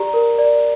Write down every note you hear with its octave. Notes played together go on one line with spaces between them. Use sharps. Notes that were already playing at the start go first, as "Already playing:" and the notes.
Already playing: G4 D5 A#5
A#4
D5